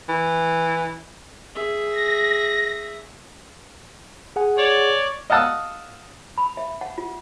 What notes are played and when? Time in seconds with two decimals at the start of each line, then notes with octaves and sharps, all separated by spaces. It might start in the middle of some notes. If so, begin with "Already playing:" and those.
0.09 E3
1.55 G#4 E5
1.90 A#6
4.36 G#4 F#5 G#5
4.58 C#5 D5
5.30 D#5 F5 F#5 A5 D#6 E6
6.38 B5
6.57 E5
6.81 F#5
6.98 F4